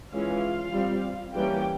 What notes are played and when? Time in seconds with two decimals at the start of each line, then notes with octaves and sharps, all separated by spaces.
0.12 E3 G#3 C#4 F4 F5
0.73 G3 C4
1.34 E3 G3 A#3 C#4 G4 G5